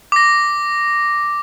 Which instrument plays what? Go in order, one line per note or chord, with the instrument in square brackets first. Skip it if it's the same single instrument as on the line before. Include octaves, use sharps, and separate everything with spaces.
[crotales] D6 A#6